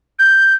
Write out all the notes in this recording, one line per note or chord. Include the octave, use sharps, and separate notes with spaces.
G6